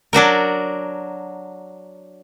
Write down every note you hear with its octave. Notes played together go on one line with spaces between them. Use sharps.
F#3 D4 F#4 A#4